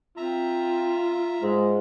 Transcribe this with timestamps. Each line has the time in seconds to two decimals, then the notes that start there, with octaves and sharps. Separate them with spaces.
0.17 C4 F4 E5 A#5
1.42 G#2 G#3